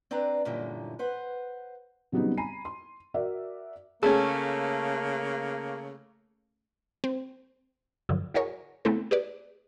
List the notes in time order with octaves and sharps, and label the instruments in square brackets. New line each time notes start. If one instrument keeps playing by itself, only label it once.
[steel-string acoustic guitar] C4 D4 B4 D5 A#5
F#2 A#2 D3 E3 G3 G#3
B4 C5 F#5
[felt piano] C#3 F#3 G3 B3 C4 D#4
G#5 A#5 B5 C7 D#7
C6
F#4 A#4 D5 E5
[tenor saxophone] C#3 [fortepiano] A3 C#4 [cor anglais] A#3 [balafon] G#4
[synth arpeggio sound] C4
G2 D3 F3 F#3
E4 F#4 G#4 A#4 C#5
C#3 A3 B3 C4 E4 A4
G4 G#4 B4 D5